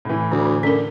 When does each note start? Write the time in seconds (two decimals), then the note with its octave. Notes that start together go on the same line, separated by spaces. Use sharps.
0.05 A2 E3
0.31 D2 D3
0.63 D3 C#4 A#4